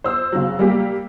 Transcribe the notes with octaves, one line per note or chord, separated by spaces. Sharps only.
C5 E6
C#3 F#3
G3 A#3 G4